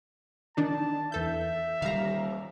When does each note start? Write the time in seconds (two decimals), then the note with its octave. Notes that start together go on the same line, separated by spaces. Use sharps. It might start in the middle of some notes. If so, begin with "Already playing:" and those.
0.57 D#3 D4 D#4 A5
1.12 E2 A4 E5 G6
1.82 D#3 G3 F5 A#5